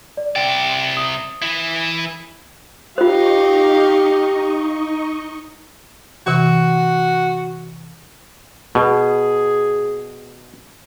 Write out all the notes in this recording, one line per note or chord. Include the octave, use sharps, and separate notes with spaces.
D5
C3 D5 G5
D#6
E3 E4
D#4 F4 G4 C5 D#5 F5 C#6
C3 E3 F#4
B2 G#4